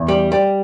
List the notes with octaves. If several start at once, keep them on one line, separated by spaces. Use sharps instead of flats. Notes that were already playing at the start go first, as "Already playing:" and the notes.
Already playing: E2
G3
G3